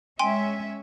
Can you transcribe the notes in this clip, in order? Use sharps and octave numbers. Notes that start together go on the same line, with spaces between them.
G#3 C#4 E5 G5 G#5 C6